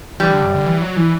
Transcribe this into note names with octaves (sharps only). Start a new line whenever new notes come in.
E3 G3
D3
F#2
D3
E3
F#3
E3